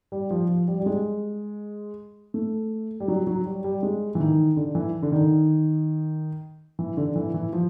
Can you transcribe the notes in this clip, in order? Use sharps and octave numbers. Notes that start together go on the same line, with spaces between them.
G3
F3
F3
G3
G3
G#3
A3
G3
F#3
F#3
G3
G3
G#3
E3
D#3
D3
E3
D3
D#3
E3
D3
E3
E3
F3